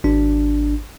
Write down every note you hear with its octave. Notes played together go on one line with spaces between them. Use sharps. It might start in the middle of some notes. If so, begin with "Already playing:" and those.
G#1 D4